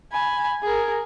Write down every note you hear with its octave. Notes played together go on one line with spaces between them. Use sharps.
G#5 B5
G#4 A#4